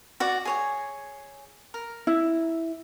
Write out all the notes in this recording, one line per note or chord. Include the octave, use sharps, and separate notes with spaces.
F#4 D5 F#5
G#4 C#5 G#5
A#4
E4